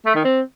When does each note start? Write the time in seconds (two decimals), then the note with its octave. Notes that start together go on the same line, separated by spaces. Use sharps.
0.06 A3
0.15 D#3
0.25 C4